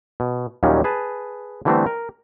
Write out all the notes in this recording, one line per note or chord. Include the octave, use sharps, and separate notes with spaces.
B2
D#2 A#2 D#3 F#3 G3 C#4
G#4 B4 A5
D3 E3 G3 A3 B3 C4
A#4